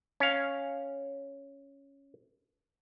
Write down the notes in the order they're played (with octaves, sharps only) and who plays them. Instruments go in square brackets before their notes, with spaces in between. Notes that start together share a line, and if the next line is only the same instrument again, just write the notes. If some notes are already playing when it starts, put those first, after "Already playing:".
[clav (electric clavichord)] C#4 F5